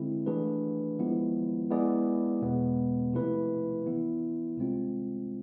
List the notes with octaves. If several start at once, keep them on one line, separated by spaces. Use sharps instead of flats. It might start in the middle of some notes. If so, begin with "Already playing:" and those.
Already playing: D3 G#3 C4 E4
E3 A3 D4 G#4 B4
F3 G#3 B3 E4
G#3 B3 E4 G#4 D5
E2 B2 G#3 B3
C3 F3 A3 E4 B4
E3 B3 E4
C2 C3 G#3 C4 F4